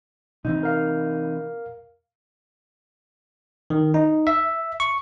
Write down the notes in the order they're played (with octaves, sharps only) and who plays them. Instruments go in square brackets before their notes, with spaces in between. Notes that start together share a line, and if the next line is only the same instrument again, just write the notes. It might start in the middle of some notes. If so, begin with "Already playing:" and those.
[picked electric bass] C3 E3 C4 [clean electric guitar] D#4
[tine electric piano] A#4 F5
D#3
D#4
E5
C#6